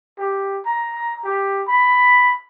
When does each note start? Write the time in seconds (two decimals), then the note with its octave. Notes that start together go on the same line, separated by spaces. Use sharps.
0.19 G4
0.66 A#5
1.24 G4
1.68 B5